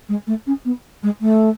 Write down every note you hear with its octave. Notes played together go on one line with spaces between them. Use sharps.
G#3
A3
C#4
B3
G#3
A3